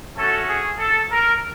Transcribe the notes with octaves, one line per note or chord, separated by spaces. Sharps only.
A3 C#4 F#4 A4
G#4
A4
A#4